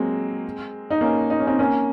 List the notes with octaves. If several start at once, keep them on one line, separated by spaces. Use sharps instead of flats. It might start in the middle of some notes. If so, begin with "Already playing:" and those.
Already playing: F#3 G#3 A#3 C4
D#4
A#3 C#4
D#4
C#4
C4 D#4
A#3 C#4